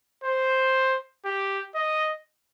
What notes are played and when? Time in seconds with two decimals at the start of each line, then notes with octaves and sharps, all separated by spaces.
0.24 C5
1.25 G4
1.75 D#5